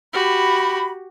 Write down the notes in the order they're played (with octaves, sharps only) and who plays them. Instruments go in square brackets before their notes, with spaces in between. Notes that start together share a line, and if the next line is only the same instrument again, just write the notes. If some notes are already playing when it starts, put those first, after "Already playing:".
[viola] F#4 G4 [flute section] B5